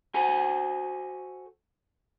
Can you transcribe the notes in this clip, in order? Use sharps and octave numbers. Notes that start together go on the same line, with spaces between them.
F#4 A4 C5 G#5